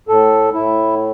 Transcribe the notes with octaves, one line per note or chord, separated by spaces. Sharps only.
A2 A4
A2 E4